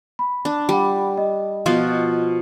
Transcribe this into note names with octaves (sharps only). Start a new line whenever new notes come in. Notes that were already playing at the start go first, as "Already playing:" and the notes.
B5
D4
G3 F#5 B5 D6
D#5
B2 F3 F4